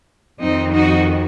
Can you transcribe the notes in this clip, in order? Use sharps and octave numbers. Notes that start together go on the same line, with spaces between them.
F2 D#3 C4 D#4
D#4 F#4